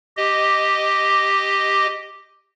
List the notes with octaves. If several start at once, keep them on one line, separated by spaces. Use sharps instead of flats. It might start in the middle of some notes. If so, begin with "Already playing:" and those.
G4 D#5